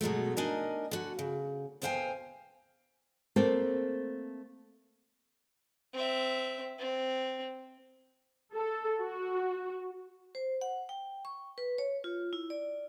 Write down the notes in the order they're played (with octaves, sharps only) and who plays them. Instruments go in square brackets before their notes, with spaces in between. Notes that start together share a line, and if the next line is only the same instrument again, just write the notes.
[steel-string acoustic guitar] B2 F#3 G#3 A3
D4 D#4 A#4 D#5 G#5
D3 F#4
C#3
D2 B2 C5 F5 G5 G#5
[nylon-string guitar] A3 A#3 C4 A4
[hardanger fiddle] C4 E5
C4
[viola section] A4
F#4
[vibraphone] C5
F#5
G5
C#6
B4
C#5
F4
E4
D5